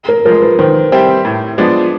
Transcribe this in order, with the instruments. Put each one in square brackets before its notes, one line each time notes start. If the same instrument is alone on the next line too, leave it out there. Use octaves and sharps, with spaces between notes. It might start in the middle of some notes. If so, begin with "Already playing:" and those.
[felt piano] A#4
[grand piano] F3 G#3 [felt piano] A#4
[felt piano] B4
[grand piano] D#3 [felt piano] C5
[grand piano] G3 C4 E4 G4
A2
F3 G#3 B3 D4